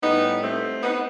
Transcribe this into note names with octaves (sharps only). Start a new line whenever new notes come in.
A2 G3 B3 D#4
A3 C4
B3 D#4